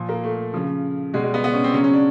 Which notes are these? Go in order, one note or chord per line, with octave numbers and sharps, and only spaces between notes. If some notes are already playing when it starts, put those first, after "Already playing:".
Already playing: A#2 F3
A#3
A3
C#3 F3
B2 G3 G#3
G#3
B3
B3
C#4
C4
C#3 F#3 C#4
C#4
D4